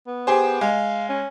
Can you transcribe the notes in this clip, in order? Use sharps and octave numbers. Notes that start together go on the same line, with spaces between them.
B3
G4 G#4 C5
G#3 F5
C#4